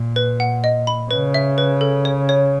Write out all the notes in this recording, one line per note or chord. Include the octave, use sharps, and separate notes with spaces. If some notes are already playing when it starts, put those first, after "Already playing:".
Already playing: A#2
B4
F#5
D#5
B5
C#3 B4
E5
B4
A4
C#5
C#5